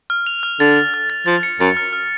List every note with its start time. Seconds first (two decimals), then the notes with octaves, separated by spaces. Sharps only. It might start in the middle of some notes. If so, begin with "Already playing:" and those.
0.10 F6
0.27 F7
0.43 F6
0.60 D3 A6
0.76 F7
0.94 F6
1.10 A6
1.26 F3 A6
1.43 C#7
1.60 F#2 A6
1.77 F6
1.93 F6